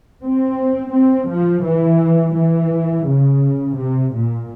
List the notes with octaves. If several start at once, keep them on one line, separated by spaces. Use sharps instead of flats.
C4
C4
F3
E3
E3
C#3
C3
A#2